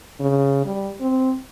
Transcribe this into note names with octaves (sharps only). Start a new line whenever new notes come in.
C#3
G3
C4